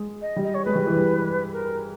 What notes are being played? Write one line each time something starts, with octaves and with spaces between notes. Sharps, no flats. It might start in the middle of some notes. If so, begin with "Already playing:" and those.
Already playing: G#3
D#5
G3
D#5
C#5
G#3 B4
G3
E3
G3
A#4